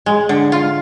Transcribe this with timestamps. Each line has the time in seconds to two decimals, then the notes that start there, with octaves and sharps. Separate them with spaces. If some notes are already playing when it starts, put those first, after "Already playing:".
0.06 G#3
0.29 D3
0.52 F4